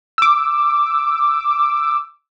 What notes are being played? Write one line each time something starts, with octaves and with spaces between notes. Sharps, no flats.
D6 E6